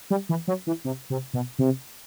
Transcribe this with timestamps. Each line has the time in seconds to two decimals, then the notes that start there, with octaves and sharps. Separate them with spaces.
0.10 G3
0.29 E3
0.48 F#3
0.67 E3
0.85 C3
1.10 C3
1.34 B2
1.59 C3